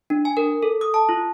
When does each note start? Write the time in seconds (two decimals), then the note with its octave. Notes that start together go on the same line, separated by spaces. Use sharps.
0.10 D4
0.25 G#5
0.37 A#4
0.63 A4
0.81 D#6
0.94 A5
1.09 F4